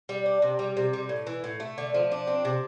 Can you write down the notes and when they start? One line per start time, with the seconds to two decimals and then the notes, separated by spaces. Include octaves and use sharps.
0.09 G3
0.26 D4
0.42 C3
0.59 G3
0.77 C3
0.93 G3
1.09 A2
1.27 E3
1.44 A2
1.60 A3
1.78 D3
1.94 F3
2.12 D4
2.27 C4
2.45 C3